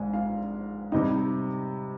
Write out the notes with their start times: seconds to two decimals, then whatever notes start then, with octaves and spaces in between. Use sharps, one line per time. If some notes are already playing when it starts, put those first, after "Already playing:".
Already playing: A#1 G#2 F3 G#3 G#5
0.13 F4 F5
0.92 C3 G3 D#4 D#5